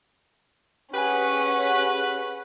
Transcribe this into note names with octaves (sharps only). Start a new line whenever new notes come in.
C#4 G4 G#4 B4 F#5